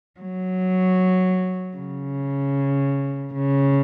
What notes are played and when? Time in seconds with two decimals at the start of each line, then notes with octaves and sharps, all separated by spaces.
0.20 F#3
1.77 C#3
3.34 C#3